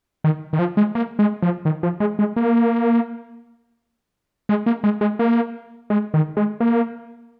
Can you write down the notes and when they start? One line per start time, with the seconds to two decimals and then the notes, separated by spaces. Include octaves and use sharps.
0.24 D#3
0.53 D#3
0.59 F3
0.77 G#3
0.95 A#3
1.19 G#3
1.42 F3
1.65 D#3
1.83 F3
2.00 G#3
2.19 G#3
2.36 A#3
4.49 G#3
4.66 A#3
4.84 G#3
5.01 G#3
5.19 A#3
5.90 G#3
6.14 D#3
6.37 G#3
6.60 A#3